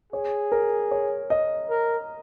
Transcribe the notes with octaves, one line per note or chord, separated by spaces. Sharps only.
G#4 C#5
A#4
C#5
D#5
A#4